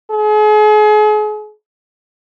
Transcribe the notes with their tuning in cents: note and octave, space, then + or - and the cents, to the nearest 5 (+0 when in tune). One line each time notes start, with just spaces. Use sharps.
G#4 +40